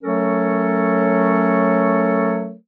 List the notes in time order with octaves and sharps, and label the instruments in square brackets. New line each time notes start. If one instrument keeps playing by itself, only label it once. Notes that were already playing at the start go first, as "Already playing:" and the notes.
[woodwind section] F#3 A3 C#4 A4 A#4 C#5